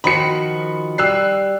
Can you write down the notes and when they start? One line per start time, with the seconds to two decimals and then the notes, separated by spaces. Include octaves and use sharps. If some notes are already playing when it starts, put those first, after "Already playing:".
0.04 D#3 F3 F#4 B5 C#7
0.98 G3 E6 F#6 C7